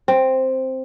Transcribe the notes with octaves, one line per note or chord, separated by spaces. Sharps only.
C4